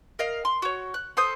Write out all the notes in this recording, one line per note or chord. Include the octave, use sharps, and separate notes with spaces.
A#4 D#5 F5
C6
F#4 C#5
F#6
A4 C5 D#6 G6